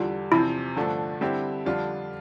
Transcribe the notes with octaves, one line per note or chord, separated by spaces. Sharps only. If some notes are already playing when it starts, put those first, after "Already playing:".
Already playing: E2 D3 G3 F4
E2 C3 F3 C4 E4
G2 D3 F3 A3 D4
D3 G3 C4 E4 G4
F2 D3 G3 D4 F4